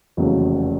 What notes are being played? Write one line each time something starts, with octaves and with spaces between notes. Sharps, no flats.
F1 E2 C#3 F#3 A#3